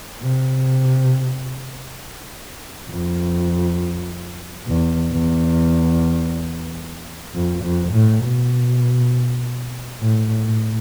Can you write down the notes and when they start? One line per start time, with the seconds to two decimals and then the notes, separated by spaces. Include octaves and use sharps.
0.22 C3
2.90 F2
4.67 E2
5.12 E2
7.34 F2
7.63 F2
7.93 A2
8.23 B2
10.01 A2
10.45 A2